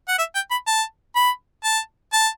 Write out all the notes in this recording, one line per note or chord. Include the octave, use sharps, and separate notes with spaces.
F#5
E5
G5
B5
A5
B5
A5
A5